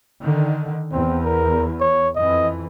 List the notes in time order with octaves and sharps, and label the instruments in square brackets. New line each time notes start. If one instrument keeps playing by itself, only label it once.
[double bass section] D3 D#3
[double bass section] E2 [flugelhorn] C4
[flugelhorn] A#4
C#5
[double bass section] F2 E3 [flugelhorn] D#5